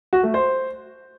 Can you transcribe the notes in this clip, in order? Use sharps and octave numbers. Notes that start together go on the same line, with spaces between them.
F#4
A3
C5